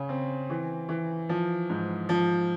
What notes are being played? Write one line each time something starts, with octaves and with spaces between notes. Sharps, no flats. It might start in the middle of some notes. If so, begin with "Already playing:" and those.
Already playing: C#3 C#4
C4
E3
E3
F3
G#2
F3